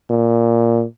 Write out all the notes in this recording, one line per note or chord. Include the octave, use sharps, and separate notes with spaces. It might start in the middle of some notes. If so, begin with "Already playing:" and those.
A#2